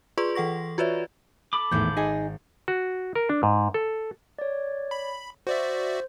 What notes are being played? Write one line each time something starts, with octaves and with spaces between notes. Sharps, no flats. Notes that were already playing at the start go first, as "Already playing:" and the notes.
F4 G#4 B4 D5 C6 C#6
E3 A4 F#5 C#6 A#6
F4 F#4 B4 C#5 D5 E5
A4 B5 D6
G#1 E2 A2 A3 G6
D#4 G#4
F#4
A#4
D4
G#2
A4
C#5 D5
B5
F#4 C5 D5 E5